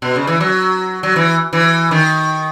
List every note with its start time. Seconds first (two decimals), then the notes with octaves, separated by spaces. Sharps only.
0.02 B2
0.16 C#3
0.27 E3
0.40 F#3
1.03 F#3
1.16 E3
1.53 E3
1.91 D#3